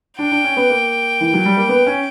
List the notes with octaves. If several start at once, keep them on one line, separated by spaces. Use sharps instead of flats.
D4 G5
D4
C#4
B3
A#3
E3
F#3
G3
A#3
B3
C#4